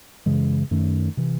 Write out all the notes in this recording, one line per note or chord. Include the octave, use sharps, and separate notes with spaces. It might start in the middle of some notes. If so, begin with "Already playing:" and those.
F#2 C#3 E3 G#3
F#2 D#3 A3
C3 E3